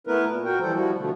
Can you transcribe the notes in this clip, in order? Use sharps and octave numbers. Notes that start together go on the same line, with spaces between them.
A3 B3 E4 A#4 B4
A#2
F#4 A#4 G5
E3 F3 G3 A4 C5
F3 G3 E4 F#4
B2 D3 F3 A3